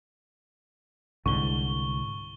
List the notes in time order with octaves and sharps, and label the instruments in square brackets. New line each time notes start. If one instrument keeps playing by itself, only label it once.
[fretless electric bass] C2 G#2 D3 [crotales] C#6 G7